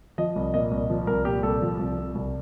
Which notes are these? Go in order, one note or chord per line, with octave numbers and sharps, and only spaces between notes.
F3 D#5
C2
A#2 D#5
C2
F3
C2 A#4
A#2 G4
C2 A4
F3
C2
C3
C2